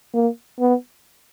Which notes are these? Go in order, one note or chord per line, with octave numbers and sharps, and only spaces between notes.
A#3
B3